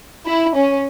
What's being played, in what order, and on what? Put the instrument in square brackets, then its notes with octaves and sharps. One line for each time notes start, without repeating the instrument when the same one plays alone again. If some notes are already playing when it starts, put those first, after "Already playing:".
[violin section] E4
C#4